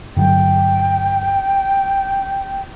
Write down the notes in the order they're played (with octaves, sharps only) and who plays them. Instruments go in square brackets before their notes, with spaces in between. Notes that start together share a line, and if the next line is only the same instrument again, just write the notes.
[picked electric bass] G2 D3 F#3 [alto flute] G5